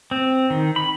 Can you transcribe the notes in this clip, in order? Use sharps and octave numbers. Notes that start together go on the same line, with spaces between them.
C4
D#3
B5